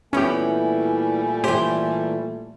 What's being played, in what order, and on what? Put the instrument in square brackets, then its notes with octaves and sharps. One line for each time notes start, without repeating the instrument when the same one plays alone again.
[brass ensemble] A#2 G3 A3 [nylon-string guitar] E3 B3 [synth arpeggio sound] C#4 G4 [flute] G#5
[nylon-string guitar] E3 C5 [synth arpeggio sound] G4